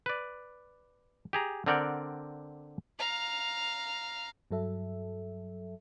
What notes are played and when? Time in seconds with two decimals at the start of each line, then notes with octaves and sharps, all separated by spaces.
0.06 B4 D5
1.33 G4 G#4 A#5
1.66 D3 C4 A#4 D5 F#5 G5
2.99 F5 A#5
4.51 G2 F#3 A4 E5